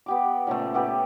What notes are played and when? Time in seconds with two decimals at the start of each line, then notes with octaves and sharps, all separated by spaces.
0.06 B3 G4 D6
0.47 A#2 C#3 F3 A3
0.74 A3 B3 G4 B4